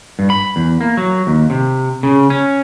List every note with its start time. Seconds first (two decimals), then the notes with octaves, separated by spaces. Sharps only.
0.19 G2
0.30 B5
0.56 E2
0.81 A#3
0.97 F#3
1.27 D#2
1.50 C3
2.03 C#3
2.30 C#4